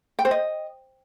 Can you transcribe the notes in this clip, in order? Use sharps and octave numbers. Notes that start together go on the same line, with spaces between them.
G5
C5
D#5